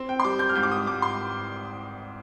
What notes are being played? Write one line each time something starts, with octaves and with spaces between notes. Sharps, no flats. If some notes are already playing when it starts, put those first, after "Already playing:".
Already playing: C4
G5
C6
G3 D6
G6
F6
G#2 G6
D6
D#6
G#2 D6
C6